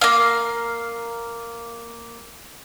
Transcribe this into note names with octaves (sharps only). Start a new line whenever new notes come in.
A#3 F5